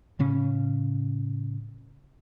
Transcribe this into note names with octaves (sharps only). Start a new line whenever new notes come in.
A2 C#3 C#4